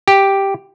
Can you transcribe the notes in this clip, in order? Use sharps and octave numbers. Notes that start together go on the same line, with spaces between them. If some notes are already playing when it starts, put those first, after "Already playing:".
G4